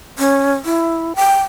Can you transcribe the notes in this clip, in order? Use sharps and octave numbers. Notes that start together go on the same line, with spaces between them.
C#4
E4
G5